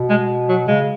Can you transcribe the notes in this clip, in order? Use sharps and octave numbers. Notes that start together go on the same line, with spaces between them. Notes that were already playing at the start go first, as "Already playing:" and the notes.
Already playing: B2
G#3
F#3
C#3 G#3